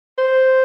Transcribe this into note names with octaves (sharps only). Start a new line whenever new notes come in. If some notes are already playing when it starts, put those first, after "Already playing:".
C5